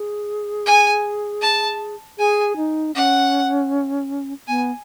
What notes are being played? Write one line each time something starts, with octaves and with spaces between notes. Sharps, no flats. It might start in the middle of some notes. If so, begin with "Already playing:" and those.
Already playing: G#4
G#5
A5
G#4 G#5
D#4
C#4 F#5
B3 G#5